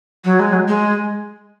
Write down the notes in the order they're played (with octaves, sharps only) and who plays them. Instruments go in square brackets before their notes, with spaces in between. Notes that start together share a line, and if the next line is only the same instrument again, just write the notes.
[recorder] F#3
G#3
F#3
G#3